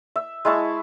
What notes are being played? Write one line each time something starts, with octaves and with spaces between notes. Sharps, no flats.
E5
G#3 E4 A5 C#6